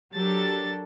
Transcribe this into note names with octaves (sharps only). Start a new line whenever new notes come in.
F#3 D4 G4 A4 A#4 A6